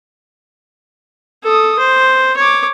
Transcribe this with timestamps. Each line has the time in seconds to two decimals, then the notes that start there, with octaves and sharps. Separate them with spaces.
1.44 A4 D#6
1.79 C5
2.37 C#5 D6